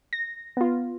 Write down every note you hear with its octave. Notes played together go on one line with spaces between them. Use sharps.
A#6
B3 F4